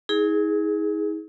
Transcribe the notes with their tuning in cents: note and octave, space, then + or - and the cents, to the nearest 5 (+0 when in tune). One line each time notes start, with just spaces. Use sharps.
D#4 +45 G#4 +0